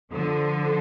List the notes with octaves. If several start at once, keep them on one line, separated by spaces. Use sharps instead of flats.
D3 F3